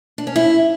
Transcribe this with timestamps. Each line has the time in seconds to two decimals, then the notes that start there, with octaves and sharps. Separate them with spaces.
0.18 D4
0.27 C#4
0.36 E4